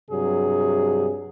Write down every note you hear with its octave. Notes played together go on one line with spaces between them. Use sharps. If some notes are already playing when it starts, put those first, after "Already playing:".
G2 C3 F#3 G#4